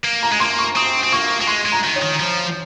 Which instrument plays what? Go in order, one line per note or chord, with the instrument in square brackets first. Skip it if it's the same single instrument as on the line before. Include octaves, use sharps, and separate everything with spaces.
[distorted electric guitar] A#3
[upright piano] A#5
[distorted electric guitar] G#3
[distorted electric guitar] A#3 [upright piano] C6
[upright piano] C#6
[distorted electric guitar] C4 [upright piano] D#6
[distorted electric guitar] C4
[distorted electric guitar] A#3 [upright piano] C#6
[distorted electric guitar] A#3
[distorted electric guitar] G#3 [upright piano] C6
[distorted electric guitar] G#3
[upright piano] A#5
[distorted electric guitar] D#3
[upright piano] C#5
[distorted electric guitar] D#3
F3